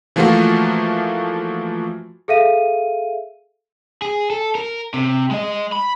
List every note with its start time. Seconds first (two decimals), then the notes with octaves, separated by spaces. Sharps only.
0.16 E3 F3 A3 A#3 F4 F#4
2.28 G#4 A4 E5 F5 D#7
4.02 G#4
4.30 A4
4.55 A#4
4.94 C3
5.31 G#3 D#5
5.72 B5